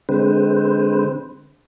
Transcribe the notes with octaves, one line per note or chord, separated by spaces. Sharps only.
D3 G#3 C4 B4 C5